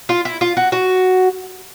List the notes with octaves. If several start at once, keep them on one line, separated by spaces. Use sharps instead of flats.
F4
E4
F4
F#4
F#4